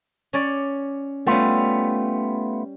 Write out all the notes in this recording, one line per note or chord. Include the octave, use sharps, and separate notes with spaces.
C#4 C#5 D5
G3 A3 B3 C#4 F4